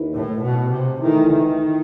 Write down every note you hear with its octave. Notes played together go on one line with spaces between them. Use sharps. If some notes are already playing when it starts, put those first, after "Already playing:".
Already playing: D#2 D#3 E4 B4
A2
B2
C3
D#3 E3 A3 E4
D#3